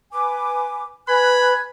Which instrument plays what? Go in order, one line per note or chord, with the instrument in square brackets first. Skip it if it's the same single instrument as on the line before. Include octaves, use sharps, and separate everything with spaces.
[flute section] B4 G#5 D6
[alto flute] B4 [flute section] G#5 F#6 G#6 [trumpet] B5